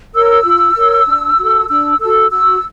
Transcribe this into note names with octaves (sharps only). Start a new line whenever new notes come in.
A#4 C#5 E6
F4
A#4 C#5
D4
F#4 A4
D4 E6
F#4 A4 E6
F#4 E6